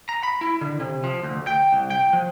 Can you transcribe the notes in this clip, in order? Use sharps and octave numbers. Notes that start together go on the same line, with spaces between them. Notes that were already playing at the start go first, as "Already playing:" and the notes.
A#5
B5
E4
D3
C3
F3
D2
G5
C2
G5
F3